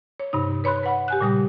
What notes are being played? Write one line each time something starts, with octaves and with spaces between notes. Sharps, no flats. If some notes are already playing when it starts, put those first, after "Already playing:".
C#5
G2 C3 D#4
B4 C#5 B5 C6 F#6
B4 F#5 B5
G4 G#5 F#6
A#2 C#3 G3 D#6